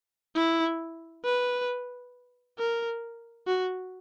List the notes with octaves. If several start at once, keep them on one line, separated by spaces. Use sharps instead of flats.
E4
B4
A#4
F#4